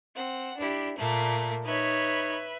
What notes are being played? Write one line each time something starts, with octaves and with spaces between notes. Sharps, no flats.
C4 F#5
D4 E4 G4
A#2 A3 A#3
D#4 B4 C#5 E5